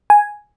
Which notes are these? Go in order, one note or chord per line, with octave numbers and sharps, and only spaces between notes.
G#5